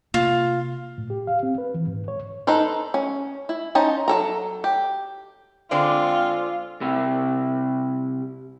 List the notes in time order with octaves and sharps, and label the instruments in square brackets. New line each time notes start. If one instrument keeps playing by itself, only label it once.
[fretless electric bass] C3 A#3 [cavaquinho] F4
[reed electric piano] A2
G4
F5
C4
B4
E3
G#2
C#5
[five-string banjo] D#4 A4 B4 C5
C#4
E4
C#4 D#4 C5 D#5 A5
F#3 A4 A#5
G4
[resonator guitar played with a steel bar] D3 G#3 D5 [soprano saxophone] C4 [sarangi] F4
[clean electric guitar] C3 G3 E4